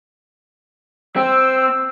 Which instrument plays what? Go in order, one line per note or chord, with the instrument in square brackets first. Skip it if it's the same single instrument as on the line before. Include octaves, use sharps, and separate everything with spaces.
[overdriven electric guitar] C4 [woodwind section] E6